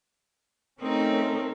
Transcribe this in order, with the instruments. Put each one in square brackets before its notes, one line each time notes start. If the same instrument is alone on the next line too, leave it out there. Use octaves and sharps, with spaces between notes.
[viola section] A3 C#4 A#4 [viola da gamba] C4 D#4